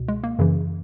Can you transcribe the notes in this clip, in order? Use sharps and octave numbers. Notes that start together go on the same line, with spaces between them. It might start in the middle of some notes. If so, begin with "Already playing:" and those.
Already playing: C#2 B2
G#3
A#3
F#2 C#3 E3